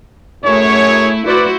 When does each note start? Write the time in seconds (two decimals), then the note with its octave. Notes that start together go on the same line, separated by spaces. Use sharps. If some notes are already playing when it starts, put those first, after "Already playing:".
0.44 F#2 A3 E4 G#4 C#5
1.27 E4 F#4 B4 C5 D5